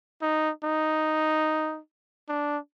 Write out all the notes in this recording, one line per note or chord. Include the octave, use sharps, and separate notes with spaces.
D#4
D#4
D4